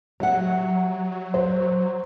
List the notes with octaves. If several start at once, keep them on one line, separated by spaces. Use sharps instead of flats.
F#3 G4 E5 F#5
C5